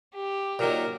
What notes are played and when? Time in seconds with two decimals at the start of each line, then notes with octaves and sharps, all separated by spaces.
0.15 G4
0.59 A#2 D#3 F#3 A#4